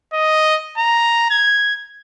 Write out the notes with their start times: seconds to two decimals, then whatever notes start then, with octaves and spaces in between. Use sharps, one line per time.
0.13 D#5
0.78 A#5
1.30 G#6